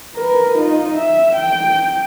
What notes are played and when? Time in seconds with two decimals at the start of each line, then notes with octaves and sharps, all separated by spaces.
0.16 A#4 B4
0.58 D#4 F4
0.97 E5
1.36 G5